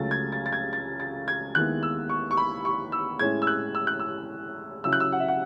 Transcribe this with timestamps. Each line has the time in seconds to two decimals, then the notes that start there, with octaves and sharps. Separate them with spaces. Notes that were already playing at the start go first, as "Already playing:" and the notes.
Already playing: C#2 C#3 F#3 A3 A6
0.11 G#6
0.32 A6
0.46 A6
0.53 G#6
0.73 A6
1.00 A6
1.28 G#6
1.55 D#2 D#3 G#3 B3 E4 F#6
1.83 E6
2.09 C#6
2.31 C#6
2.37 B5
2.65 C#6
2.92 E6
3.19 A2 G#3 C#4 E4 G#6
3.42 E6
3.47 F#6
3.75 E6
3.87 F#6
4.00 E6
4.84 C#3 F#3 C#4 E4 E6
4.93 F#6
5.00 E6
5.12 F#5
5.20 E5
5.28 F#5